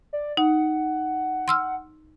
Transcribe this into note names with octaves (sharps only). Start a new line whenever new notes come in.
D5
D#4 F#5
C6 E6 F6